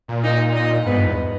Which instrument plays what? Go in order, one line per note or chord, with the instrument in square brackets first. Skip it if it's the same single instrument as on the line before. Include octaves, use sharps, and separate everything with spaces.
[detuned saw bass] A#2
[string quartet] D#4 D#5
D#4 D#5
[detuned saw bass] G#2 [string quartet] B3 B4
[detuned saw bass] G2
E2